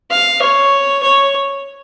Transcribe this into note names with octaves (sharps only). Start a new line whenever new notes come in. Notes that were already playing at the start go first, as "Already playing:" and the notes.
F5
C#5
C#5